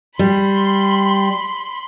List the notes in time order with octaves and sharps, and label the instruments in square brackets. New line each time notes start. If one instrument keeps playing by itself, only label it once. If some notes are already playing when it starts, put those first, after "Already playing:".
[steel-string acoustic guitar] G3 [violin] B5 C6